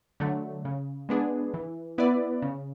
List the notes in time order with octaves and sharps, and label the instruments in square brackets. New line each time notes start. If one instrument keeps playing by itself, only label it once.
[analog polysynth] D3 F#3 A3
C#3
G#3 B3 D4 G#4
E3
B3 E4 B4 D5
C#3